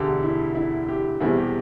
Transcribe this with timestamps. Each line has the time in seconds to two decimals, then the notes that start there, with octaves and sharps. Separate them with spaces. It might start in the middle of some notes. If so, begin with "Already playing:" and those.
Already playing: E1 D2 D3 G4
0.23 E4
0.55 E4
0.88 G4
1.20 E1 E2 C3 G3 E4
1.37 G4